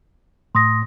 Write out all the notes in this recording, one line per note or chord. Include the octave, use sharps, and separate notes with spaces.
A2 C6 D#6 A#6